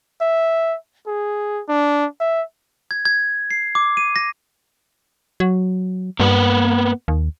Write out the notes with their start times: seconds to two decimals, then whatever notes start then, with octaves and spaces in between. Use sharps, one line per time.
0.21 E5
1.07 G#4
1.68 D4
2.20 E5
2.91 G#6
3.05 G#6
3.51 C7
3.75 D6
3.97 D#7
4.16 A#6
5.40 F#3
6.20 G2 A#3 B3 B4
7.08 D#2